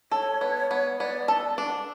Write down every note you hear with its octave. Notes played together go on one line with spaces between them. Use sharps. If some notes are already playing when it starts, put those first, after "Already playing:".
A4 C#5
B3
B3
B3 D5
A4
D4